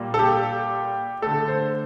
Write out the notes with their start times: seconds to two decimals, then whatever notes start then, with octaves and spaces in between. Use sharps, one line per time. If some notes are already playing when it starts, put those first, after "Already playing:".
Already playing: A#2 G3 A#3
0.14 A4
0.19 G4
1.22 D3 A3 A4
1.48 C5